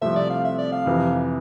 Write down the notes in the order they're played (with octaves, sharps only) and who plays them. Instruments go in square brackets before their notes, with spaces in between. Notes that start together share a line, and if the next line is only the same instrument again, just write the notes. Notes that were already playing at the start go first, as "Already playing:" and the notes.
[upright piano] C2 C3 F3 A3 C4 [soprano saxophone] E5
[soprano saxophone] D5
F5
E5
D5
F5
[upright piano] F2 C3 E3